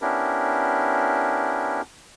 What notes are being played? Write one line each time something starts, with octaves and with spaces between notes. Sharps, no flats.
B3 C#4 D4 E4 G4 A#4